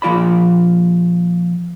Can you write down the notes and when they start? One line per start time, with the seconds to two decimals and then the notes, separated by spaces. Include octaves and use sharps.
0.02 A#2 F3 F4 D5 B5